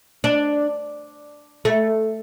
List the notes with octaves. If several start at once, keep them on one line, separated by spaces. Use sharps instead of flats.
D4
A3